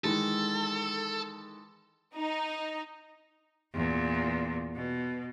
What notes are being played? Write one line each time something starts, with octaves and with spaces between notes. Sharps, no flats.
D#3 E3 G#3 A4
D#4
E2 A#2
B2